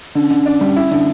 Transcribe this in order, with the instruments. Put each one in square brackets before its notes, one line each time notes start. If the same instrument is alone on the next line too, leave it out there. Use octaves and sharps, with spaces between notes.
[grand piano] D3 [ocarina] C#4
[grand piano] D3
D4
G3
E4
D3